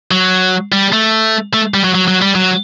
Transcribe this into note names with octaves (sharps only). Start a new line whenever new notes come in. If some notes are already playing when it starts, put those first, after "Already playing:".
F#3
G3
A3
A3
G3
F#3
F#3
F#3
G3
F#3